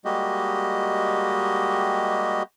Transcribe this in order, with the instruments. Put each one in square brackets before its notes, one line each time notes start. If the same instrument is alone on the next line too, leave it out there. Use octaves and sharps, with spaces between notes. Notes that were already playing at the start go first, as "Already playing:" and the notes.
[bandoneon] G3 G#3 A#3 F#4 G4 D#5